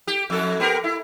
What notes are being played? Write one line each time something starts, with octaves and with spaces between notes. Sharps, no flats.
G4
F2 A4
B3 G4 A#4
E4